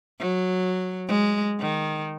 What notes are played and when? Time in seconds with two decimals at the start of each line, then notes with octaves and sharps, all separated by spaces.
0.19 F#3
1.08 G#3
1.60 D#3